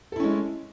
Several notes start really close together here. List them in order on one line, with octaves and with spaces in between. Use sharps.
A4 E4 C#4 G#3